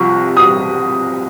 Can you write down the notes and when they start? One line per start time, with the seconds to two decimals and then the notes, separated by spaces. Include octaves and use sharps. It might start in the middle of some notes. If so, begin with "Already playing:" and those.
Already playing: C2 C3 F3 C#6
0.37 D#6